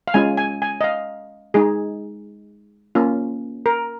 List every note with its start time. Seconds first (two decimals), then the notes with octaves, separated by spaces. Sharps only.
0.08 F5
0.14 G#3 C#4 F4 G#5
0.37 G#5
0.62 G#5
0.81 D#5
0.84 F5
1.54 G#3 D#4 G#4
2.95 A#3 C#4 F4
3.66 A#4